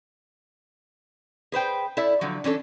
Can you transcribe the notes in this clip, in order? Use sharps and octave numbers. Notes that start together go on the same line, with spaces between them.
G#4 B4 C5 G5
E4 A4 D5 E5
D3 F3 F#3
E3 C#4 D4 A4